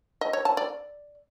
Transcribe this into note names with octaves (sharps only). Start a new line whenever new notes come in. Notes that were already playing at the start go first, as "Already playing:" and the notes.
D#5
C#5
A5
D5